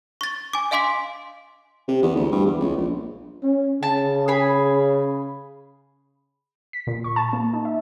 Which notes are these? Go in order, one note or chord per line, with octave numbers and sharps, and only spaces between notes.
C#6 A6
G#5 D6
D#5 F5 G#5 C6 D6 B6
C3
E2
D2
G2
E2
C#2
A#1
C#4
C#3 A5
G#4 B5
B6
A#2
C#6
A5
A#3
D#4
E5